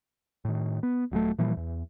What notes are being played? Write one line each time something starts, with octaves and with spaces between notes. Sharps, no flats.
A2 D#3
B3
D#1 F#3 G#3 A3
A#2 E3 F3 G3
E2